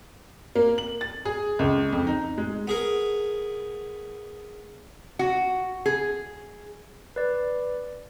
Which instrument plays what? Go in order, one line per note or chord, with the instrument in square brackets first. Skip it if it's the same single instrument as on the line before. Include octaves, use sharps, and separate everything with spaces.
[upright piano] A#3
F#7
A6
G#4
C#2
F2
D#4
G#3
[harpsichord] B3 G#4 A#4
[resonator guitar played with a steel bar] F#4
G#4
[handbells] B4 D5